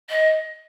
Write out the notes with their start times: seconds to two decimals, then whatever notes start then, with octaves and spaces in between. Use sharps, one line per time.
0.09 D#5